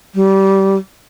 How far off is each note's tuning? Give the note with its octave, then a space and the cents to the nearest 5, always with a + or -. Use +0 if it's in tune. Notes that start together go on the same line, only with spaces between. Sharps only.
G3 -20